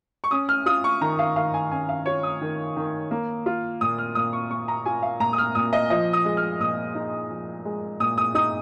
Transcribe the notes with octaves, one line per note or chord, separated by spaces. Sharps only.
C#6
C#4 D#6
F6
F4 D#6
C#6
D#3 A#5
F5
D#3 F5
G#5
C#4 G#5
F5
F4 C#5
D#6
D#3
D#3
A#3
F4
A#2 D#6
F6
A#2 D#6
C#6
A#3 C#6
A#5
F4 G#5
F5
A#2 A#5
D#6
F6
A#2 D#6
D#5
F3 D#5
D#6
G#3
F6
A#2 D#6
D#4
F3
G#3
A#2 D#6
D#6
D#4 D#6